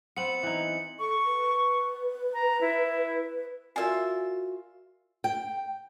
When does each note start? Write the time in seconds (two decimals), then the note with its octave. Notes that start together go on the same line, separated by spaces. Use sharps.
0.17 B3 C4 C#7 F#7
0.43 E3 D#4
0.99 A4 C#6
1.25 B4
2.33 A#5
2.61 E4
3.76 F4 F#4 A#4 D5 E5 G#5
5.24 G5